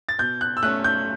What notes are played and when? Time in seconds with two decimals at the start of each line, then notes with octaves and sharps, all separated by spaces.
0.09 A6
0.18 B2 G6
0.41 F#6
0.57 E6
0.63 A3 C#4 F#6
0.84 G6